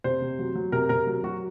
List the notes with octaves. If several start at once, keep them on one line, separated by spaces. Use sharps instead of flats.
C3 C5
C3
F#3
F#3
C3 A#4
C3 A#4
F#3
F#3 F#4